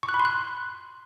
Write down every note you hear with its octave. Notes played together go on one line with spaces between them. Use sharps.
C#6
F#6
B5
C6
F#6